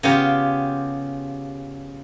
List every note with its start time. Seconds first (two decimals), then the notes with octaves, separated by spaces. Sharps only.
0.03 C#3 B3 F4 G4